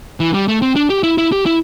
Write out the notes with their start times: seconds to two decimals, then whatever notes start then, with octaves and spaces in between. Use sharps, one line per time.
0.20 E3
0.34 G3
0.48 A3
0.62 C4
0.76 D4
0.90 G4
1.03 E4
1.18 E4
1.32 G4
1.46 E4